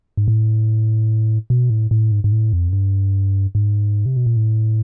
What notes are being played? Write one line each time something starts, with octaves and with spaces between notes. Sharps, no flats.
G#2
A2
B2
A2
A2
G#2
G#2
A2
F2
F#2
G2
G#2
C3
B2
A#2
A2